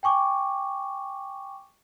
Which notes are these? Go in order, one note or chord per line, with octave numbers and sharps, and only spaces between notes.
G5 G#5 C#6 D6